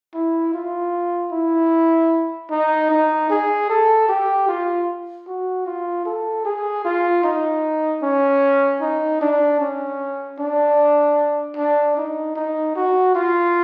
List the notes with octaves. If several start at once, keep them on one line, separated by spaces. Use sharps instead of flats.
E4
F4
E4
D#4
D#4
G#4
A4
G4
F4
F#4
F4
A4
G#4
F4
D#4
C#4
D#4
D4
C#4
D4
D4
D#4
D#4
F#4
F4